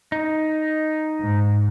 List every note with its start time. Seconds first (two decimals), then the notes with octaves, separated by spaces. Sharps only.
0.12 D#4
1.21 G#2